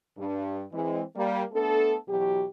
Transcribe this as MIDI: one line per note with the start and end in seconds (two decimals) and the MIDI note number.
0.18 0.62 43
0.73 1.01 52
0.73 1.01 56
0.73 1.01 60
1.16 1.43 55
1.16 1.43 58
1.53 1.97 57
1.53 1.97 59
1.53 1.97 62
1.53 1.97 69
2.09 2.45 47
2.09 2.45 52
2.09 2.45 54
2.09 2.45 67